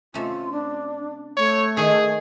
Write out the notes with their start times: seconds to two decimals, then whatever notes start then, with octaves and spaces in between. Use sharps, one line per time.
0.14 C3 A3 C#4 F4
0.51 D4
1.37 A3 C#5
1.77 D#3 G#4